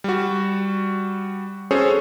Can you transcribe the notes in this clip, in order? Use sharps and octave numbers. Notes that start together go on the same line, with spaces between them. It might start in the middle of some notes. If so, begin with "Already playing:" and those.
G3 F#4
C#4 F#4 G#4 A4 C5 C#5